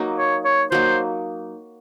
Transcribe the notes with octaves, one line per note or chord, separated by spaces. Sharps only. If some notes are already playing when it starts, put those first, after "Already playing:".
Already playing: F#3 A#3 D#4
C#5
C#5
F#3 A#3 D#4 C5